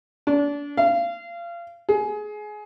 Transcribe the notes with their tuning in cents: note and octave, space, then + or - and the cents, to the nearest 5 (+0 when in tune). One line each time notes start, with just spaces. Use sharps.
D4 -30
F5 -30
G#4 +20